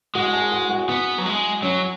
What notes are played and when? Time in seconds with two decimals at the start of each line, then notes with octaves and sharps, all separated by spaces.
0.15 G#3 F#4
0.33 G#4
0.52 F#4
0.70 F#4
0.89 B3
1.18 F#3
1.26 G#3
1.62 F#3 C#4